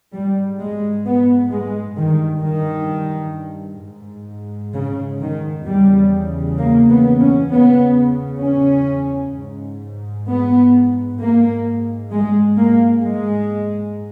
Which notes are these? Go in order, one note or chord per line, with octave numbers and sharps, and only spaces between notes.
G#2 G3
G#3
B3
G#3
G2 D#3
D#3
G#2
C#3
D#3
E2 C#3 G3
A#3
B3
C#4
E2 C#3 B3
C#4
G#2
B3
G#2 A#3
G#3
A#3
G#2 G#3